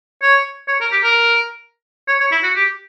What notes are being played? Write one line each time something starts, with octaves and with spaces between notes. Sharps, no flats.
C#5
C#5
A#4
G4
A#4
C#5
C#5
E4
F#4
G4